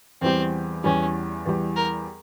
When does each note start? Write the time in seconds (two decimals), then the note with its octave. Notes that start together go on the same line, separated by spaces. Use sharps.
0.21 E2 E3 G3 C4
0.84 E2 E3 G3 C#4
1.45 E2 E3 G3
1.76 A#4